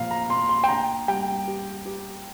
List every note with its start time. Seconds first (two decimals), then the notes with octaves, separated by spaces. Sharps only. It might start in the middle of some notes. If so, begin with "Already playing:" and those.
Already playing: A#2 F3 F5 A#5
0.11 A#5
0.30 A#2 C6
0.49 C6
0.64 G5
0.69 D4 A#5
1.08 G3 G5
1.48 G4
1.86 G4